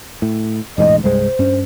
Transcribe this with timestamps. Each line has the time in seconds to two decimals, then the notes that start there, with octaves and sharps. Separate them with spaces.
0.22 A2
0.78 E1 A1 G#2 D#5
1.04 C2 G2 G#3 C5
1.39 G2 C#4